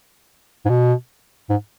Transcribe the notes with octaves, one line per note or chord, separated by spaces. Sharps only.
G#2
B2
G#2